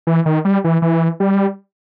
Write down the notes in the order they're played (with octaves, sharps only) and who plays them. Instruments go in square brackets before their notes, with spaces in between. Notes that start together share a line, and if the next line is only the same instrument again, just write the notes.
[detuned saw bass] E3
D#3
G3
E3
E3
G3